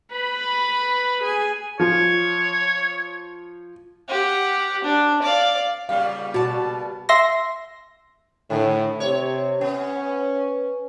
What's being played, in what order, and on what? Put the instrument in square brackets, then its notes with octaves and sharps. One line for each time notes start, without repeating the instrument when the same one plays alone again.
[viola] B4 B5
G#4 G#5
[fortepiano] F3 [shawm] C#5
[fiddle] G4 F#5
D4
D5 F5
[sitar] A#2 C#3 G3 [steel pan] F5
[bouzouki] B2 A5 [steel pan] F#4
[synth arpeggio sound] E5 C6 A#6
[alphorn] A2 [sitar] D3
[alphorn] C3 [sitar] C#5
[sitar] B3 [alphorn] C#4